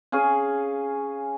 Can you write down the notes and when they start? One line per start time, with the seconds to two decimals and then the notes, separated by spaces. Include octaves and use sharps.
0.12 C#4 G#4 F5 G#5